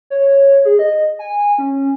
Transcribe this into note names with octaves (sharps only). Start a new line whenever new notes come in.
C#5
G#4
D#5
G#5
C#4